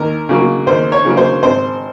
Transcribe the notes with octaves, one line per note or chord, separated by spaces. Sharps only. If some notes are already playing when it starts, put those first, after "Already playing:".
Already playing: D#2 A#4
C#3 F#3 A#3
D#2 C5
C#5
C#3 F#3 A#3
C5
G#1 C5